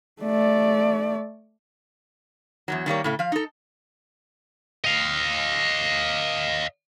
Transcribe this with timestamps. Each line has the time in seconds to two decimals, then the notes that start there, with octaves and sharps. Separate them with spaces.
0.22 A3 D5
2.68 E2 G#2 F#3
2.86 D#3 G3 A#3 C#5
3.04 A2 C#3 A3
3.19 F3 F5
3.32 D#4 A4
4.84 D#5 F5